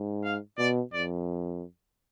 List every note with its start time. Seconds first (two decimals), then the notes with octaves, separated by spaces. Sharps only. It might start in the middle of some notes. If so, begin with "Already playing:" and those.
Already playing: G#2
0.24 F5
0.58 B2 D5
0.93 F2 D5